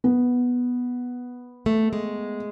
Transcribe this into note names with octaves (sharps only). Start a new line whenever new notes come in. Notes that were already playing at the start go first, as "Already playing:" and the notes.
B3
A3
G#3